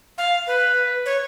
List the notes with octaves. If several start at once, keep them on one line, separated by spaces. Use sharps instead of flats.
F5
B4
C#5